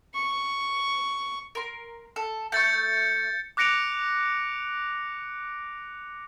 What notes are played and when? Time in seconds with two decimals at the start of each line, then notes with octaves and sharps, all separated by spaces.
0.14 C#6
1.55 A#4 C6
2.16 A4
2.52 A3 C#6 G6 A6 C#7
3.57 D6 F#6 A#6 C#7 D7 F7